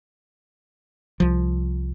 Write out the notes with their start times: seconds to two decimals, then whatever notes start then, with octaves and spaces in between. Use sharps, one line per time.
1.20 C2 F3